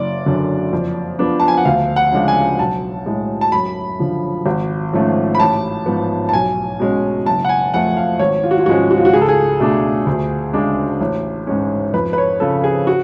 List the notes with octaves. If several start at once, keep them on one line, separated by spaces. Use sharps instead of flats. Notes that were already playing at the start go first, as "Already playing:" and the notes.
Already playing: F#1 D5
F#2 D3
F2
F3 B3 D4
A5
G#5
F#5
D2 F5
F#5
C#3 F3 G#3 D4
G#5
B1 A5
A2 G#3
A5
F#2 B5
D3 F3
G#1
G#2 F3 A3 C#4
B5
A1 A5
G#2 F3 B3
A5
B1 G#5
B2 G#3 C#4
F#1 A5
F#5
G#5
F2 F3 A3 F#5
F5
G#1 C#5
F4
F#4
F4
G#2 F3 G#3 C#4 F#4
F#4
F4
F#4
C#2 G#4
A4
G#4
B2 A3 D4
D2
C#3 G#3 D4
A1
G#2 G#3 C#4
F2 B4
B4
C#5
C#3 F3 A4
G#4
F#4